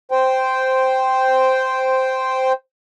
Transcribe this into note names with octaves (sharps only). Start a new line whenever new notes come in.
C5 G5